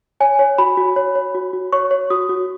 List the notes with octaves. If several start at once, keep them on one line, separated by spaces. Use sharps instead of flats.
C#5 G#5
C#5
F#4 B5
F#4
C#5
C#5
F#4
F#4
C#5 C#6
C#5
F#4 D#6
F#4